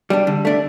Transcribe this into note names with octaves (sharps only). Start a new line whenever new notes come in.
G3 D4
D3
A3 D4